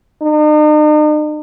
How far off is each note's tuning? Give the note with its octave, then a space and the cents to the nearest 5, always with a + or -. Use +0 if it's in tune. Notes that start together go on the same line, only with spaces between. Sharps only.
D#4 -45